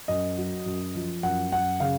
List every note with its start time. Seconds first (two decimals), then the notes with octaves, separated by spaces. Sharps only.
0.08 F#2 D#5
0.38 F#3
0.66 F#2
0.95 F3
1.23 F#2 F#5
1.52 F#2 F#5
1.80 C#3 F5